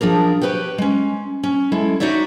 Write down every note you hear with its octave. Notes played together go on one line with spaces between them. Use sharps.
F3 D4 G#4 A#4
G4 A#4 B4 C#5 G5
G#3 C#4
C#4
G#3 E4 A4
D#4 F#4 C#5 D5 E5